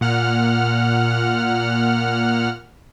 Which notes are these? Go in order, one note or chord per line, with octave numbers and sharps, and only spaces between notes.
A#2 F#5 F6